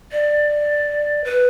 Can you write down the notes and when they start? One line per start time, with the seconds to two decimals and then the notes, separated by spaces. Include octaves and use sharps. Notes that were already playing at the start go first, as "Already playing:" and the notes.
0.12 D5
1.24 B4